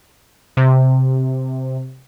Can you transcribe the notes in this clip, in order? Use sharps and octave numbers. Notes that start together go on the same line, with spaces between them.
C3